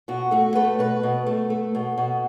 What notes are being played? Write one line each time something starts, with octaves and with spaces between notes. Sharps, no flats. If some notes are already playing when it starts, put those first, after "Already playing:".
B2 F#4
A3 F#4
A3 B4
B2 B4
B2
A3
A3
B2
B2